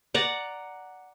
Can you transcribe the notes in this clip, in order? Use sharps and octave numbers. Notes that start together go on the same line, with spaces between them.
D5 F#5 A#5